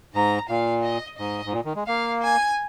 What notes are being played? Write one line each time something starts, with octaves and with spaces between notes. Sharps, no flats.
G#2 A#5
A#2 F5
D#5
G#2 D#5
G#2
A#2
D#3
G#3
A#3 F5
G#5